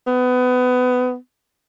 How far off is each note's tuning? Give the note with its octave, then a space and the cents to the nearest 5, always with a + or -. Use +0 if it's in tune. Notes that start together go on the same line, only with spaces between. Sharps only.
B3 +25